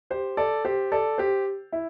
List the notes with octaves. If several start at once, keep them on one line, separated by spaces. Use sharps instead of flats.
G4 C5
A4 D5
G4 C5
A4 D5
G4 C5
E4